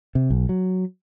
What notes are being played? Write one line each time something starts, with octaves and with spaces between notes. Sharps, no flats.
C3
B1
F#3